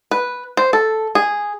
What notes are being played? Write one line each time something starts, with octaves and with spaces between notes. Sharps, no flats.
B4
C5
A4
G#4